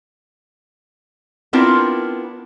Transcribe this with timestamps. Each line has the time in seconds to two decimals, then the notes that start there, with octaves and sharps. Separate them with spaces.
1.53 B3 C4 D4 E4 F4 A#4